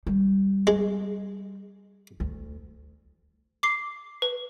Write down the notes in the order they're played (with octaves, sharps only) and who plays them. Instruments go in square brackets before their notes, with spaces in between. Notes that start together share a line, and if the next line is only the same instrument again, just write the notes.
[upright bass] G3
[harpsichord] G#3
[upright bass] D2
[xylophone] D6 C7
B4